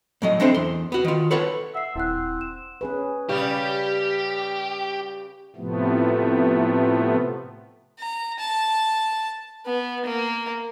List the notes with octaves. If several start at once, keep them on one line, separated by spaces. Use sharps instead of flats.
A2 F#3 D#5
C4 D4 E4 A4 C5
E2 C6
B3 F#4
D#3 F4
A4 B4 C#5 F#5
E5 F#5 C7
D#1 C4 E4 F#5 F#6
E7
C#4 G#4 B4
C#3 G3 G4
A2 C3 F3 A3 B3
A#5
A5
B3
A#3